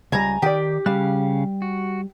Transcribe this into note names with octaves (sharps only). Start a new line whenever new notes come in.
C#2 G3 G#5 A#5
D#3 G4 D5
C#3 G3 F5 F#6
F#4